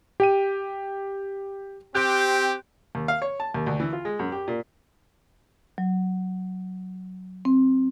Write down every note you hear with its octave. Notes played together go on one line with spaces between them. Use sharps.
G4 G5 D#7
C4 G4 F#6 G6
D#2
F5
C#5
A5
D#2
D2
E3
F4
G#3
F#2
G4
A#2
F#3
C4